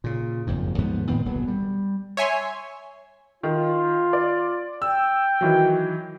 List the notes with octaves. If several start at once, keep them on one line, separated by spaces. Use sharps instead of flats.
A#2 C#3
F#1 F2 G#2
D#2 G#2 F3 B3
A2 D#3 B3 C4
D1 B1 F#3 B3
G3
C#5 E5 G#5 C6
D#3 F4
D5
G5 E6
D#3 E3 F#3